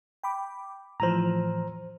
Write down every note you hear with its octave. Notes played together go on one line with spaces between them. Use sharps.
G5 B5 D6
A2 E3 F3 C5 A#5